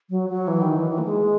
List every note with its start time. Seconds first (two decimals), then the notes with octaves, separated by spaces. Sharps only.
0.10 F#3
0.30 F#3
0.48 E3
0.62 D#3
0.77 E3
0.91 E3
0.98 A#3
1.05 G#3